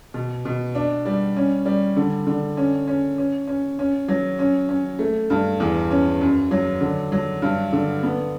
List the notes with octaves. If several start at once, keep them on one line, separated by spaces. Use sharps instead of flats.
B2
B2
D4
G3
C#4
G3
D3
D3
C#4
C#4
C#4
C#4
C#4
F#3
C#4
C#4
A3
G2
E2
C#4
F#2
F#3
D3
F#3
G2
D3
B3